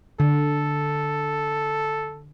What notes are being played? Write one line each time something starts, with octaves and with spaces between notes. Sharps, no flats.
D3 A4